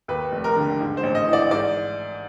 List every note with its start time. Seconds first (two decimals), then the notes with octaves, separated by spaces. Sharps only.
0.08 D#2 B4
0.32 F1
0.44 A#4
0.56 D3
0.80 G#2
0.97 C5
1.03 A1
1.15 D#5
1.27 E3
1.33 D5
1.51 G#2 D5